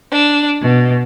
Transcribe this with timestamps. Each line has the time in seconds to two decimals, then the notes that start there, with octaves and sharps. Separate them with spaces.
0.11 D4
0.61 B2